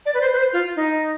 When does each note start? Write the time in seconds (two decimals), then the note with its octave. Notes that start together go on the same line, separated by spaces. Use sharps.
0.06 D5
0.14 B4
0.21 C5
0.33 B4
0.37 C5
0.53 F4
0.76 D#4